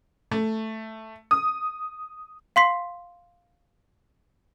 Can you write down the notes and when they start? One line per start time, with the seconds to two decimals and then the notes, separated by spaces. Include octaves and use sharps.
0.31 A3
1.31 D#6
2.56 F5 C6 B6 C7